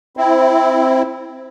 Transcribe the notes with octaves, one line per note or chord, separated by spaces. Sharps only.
C4 E4